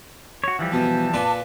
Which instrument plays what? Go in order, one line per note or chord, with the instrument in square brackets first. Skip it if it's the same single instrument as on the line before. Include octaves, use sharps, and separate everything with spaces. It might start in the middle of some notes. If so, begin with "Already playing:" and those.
[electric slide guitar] F#4 C#5
E3 F3 G3
[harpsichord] B2 [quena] A5
[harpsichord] A#2 D4 B4